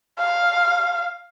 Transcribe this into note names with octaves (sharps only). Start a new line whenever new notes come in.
F5